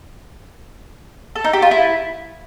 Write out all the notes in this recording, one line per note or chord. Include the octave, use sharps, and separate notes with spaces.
A4
D#4
G4
F4
E4